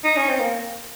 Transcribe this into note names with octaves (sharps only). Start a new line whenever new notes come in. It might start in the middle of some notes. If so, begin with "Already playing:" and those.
D#4
C#4
C4
A#3